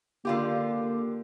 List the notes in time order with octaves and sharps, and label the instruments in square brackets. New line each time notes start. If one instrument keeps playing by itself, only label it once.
[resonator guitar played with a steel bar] D3 F4 G4 [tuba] A#3